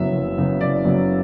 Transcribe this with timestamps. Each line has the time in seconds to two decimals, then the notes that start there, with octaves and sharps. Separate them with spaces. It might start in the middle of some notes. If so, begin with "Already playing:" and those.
Already playing: F#1 F#2 C#3 F#3 B3 E5
0.13 F#1
0.37 F#2 C#3 F#3 B3
0.61 F#1 D5
0.85 F#2 C#3 F#3 B3